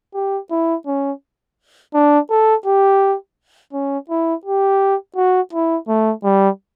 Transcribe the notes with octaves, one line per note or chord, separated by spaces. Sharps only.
G4
E4
C#4
D4
A4
G4
C#4
E4
G4
F#4
E4
A3
G3